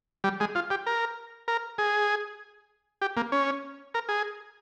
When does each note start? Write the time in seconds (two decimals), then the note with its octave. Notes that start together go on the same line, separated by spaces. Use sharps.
0.24 G3
0.40 G#3
0.55 F4
0.70 G4
0.86 A#4
1.48 A#4
1.78 G#4
3.02 G4
3.17 A#3
3.32 C#4
3.94 A#4
4.09 G#4